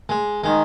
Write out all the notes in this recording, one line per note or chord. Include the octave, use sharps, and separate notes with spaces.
G#3
D#3 G#3